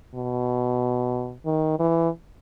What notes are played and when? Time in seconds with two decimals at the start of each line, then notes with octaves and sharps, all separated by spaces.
0.15 B2
1.46 D#3
1.79 E3